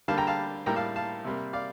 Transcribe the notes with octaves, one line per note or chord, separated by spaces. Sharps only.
D3 G3 A#3 F5 A5
G5 A#5
F5 A5
A2 G3 A#3 G5 A#5
F5 A5
F5 A5
C3 G3 A#3
D5 F5